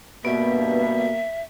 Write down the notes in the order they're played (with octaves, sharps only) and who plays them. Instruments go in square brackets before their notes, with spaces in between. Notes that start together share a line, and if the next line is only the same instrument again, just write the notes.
[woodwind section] G2 B2 [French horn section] A#3 [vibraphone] B3 [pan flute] E5